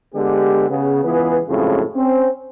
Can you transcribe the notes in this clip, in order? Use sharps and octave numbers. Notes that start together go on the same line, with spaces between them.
D3 G#3 B3 G4
C#3 B3
C#2 E3 B3 F4 G#4 B4
F#2 A2 C#3 F3 G#3 C4
C4 C#4